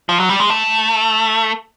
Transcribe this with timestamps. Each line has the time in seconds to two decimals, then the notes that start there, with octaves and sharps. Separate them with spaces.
0.09 F3
0.20 F#3
0.29 G3
0.40 G#3
0.50 A3